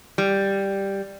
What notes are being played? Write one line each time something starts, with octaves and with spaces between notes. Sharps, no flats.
G3